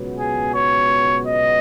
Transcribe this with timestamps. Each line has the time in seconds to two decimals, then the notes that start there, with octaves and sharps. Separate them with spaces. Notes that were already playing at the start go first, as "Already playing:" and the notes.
Already playing: C#2 B2 F#3 B3
0.19 G#4
0.55 C#5
1.26 D#5